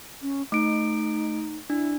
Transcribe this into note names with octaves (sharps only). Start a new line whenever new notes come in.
C#4
A3 D#4 D7
D4 E4